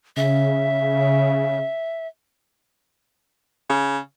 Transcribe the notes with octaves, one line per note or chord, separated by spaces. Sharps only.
C#3 E5
C#3